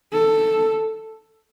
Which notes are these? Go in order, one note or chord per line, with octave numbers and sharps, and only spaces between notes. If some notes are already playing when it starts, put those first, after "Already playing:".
A4